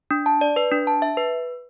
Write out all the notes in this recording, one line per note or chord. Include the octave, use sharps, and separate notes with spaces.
D4
A5
D5
B4
D4
A5
E5
B4